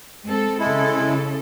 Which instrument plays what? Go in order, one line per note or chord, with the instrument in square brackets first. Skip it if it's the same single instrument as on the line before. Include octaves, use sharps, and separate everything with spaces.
[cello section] G#3 C4 A4
[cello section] C#3 A4 [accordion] G#3 E4